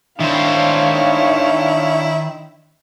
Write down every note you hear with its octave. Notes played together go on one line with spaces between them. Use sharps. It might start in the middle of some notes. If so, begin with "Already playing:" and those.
D#3 D4 E4 C5 C#5 F5